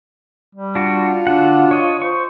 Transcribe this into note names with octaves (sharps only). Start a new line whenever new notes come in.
G3
D4 F4 F#4
D3 D4 F#4 F#5
C#5 D#5
C5 C#6